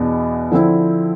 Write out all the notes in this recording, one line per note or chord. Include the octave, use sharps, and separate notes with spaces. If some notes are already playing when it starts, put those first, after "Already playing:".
Already playing: E2 B2 B3 D4
D3 F3 C4 E4